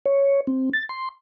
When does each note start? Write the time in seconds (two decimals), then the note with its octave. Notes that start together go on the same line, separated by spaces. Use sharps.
0.06 C#5
0.47 C4
0.73 A6
0.89 C6